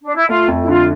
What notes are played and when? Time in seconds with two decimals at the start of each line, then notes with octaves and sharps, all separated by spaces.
0.03 D4
0.15 E4
0.29 A3 F4
0.48 F2
0.63 E4
0.68 D3 F4